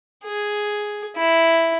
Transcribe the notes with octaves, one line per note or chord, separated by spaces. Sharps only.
G#4
E4